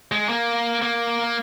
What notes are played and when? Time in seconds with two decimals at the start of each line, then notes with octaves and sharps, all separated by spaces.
0.12 G#3
0.29 A#3
0.82 A#3